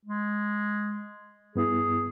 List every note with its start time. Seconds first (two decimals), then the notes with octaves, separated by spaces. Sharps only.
0.05 G#3
1.56 G2 B3 E4 G#4